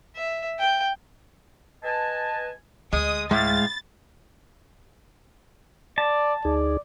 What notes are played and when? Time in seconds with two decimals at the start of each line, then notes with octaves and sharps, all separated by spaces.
0.16 E5
0.59 G5
1.83 B4 D#5 G#5 A5
2.93 D2 G#3 D#6
3.31 A2 G#3 F5 A6
5.98 D5 A5
6.45 D2 D#4 G#4 D5